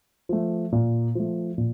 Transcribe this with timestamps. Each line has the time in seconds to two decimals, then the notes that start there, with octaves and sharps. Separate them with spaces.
0.29 F3 A3
0.72 A#2
1.15 F3 A3
1.58 A#2